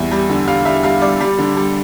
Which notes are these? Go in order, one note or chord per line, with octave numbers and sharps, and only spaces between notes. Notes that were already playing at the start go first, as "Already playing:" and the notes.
Already playing: E2 G3 E5
G3
D3
G3 F5
G3 E5
G3 F5
G3 D5
G3
D3
G3